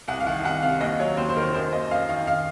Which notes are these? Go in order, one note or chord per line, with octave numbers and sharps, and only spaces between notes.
C2 F#5
F5
D#3 F#5
C2 F#5
C3 F5
D#2 D#5
F#3 C#5
D#2 C5
C5
D#3 A#4
F#2 C5
A#3 D#5
F#2 F5
D#3 F5
F5